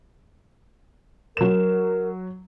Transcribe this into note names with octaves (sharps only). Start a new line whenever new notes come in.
F#3 A#4 E7